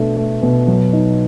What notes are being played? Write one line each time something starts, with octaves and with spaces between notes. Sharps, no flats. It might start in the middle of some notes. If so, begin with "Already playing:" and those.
Already playing: B2 A3 D4
A3
B2
F#3
D#4